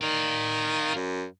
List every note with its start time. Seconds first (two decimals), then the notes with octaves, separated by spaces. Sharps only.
0.02 D#3 D5 F5
0.95 F#2